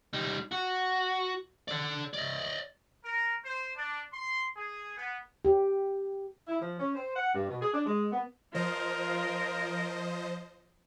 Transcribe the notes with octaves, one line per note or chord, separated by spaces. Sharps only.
G3 D#4
F#4
A4 D5
D5 D#5
A#4
C5
D4
C6
G#4
B3
G4
E4
F3
C#4
C5
F#5
G2
B2
G#4
D4
G#3
B3
F3 F4 A#4 C5 D#5